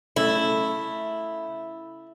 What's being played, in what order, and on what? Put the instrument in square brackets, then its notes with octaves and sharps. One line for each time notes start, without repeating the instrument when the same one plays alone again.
[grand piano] C#3 A3 [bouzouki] E4